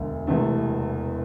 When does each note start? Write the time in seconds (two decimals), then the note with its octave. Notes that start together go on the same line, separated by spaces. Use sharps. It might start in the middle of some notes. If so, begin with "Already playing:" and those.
Already playing: E1 D2 D3
0.27 E1 E2 C3 E3 A3